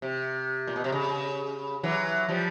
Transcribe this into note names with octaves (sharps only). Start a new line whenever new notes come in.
C3
A#2
B2
C3
C#3
E3 F#3
F3 G3